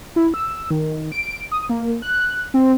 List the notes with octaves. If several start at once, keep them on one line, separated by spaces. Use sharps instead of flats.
E4
E6
D#3
D7
D#6
A#3
F#6
C4